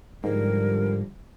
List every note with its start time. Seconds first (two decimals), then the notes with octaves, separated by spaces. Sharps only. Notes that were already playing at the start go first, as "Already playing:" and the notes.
0.24 G#2 D3 F3 G3 A#4